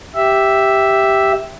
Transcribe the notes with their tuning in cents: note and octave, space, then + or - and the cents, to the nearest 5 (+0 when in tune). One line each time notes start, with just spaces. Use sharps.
G4 +0 E5 +0